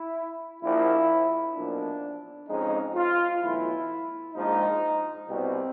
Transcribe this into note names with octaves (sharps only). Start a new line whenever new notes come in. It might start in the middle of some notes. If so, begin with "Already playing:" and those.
Already playing: E4
A#1 A#2 F3 E4
B1 A#2 F3 D4
F2 C#3 F3 G#3 D#4
F4
B1 A2 E3 E4
A#1 G#2 F3 G#3 D#4
C2 B2 G3 C4